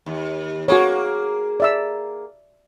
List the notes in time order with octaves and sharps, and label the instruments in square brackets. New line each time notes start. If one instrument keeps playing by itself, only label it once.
[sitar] D#2
[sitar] A#3 G#4 [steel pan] F#4 C#5
[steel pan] D5 E5 E6